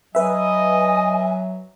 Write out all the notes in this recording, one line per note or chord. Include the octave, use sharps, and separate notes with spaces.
F#3 B4 D#5 E5 G#5